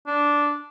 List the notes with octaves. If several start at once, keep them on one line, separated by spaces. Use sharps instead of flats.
D4